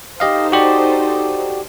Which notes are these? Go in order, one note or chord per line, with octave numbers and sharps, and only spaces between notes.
D#4 G4 A4 C5 D#5 F5
F#4 G4 D5